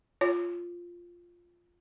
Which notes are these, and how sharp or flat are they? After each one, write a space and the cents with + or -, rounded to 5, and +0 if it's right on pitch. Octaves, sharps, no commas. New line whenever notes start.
F4 +0 C#5 +0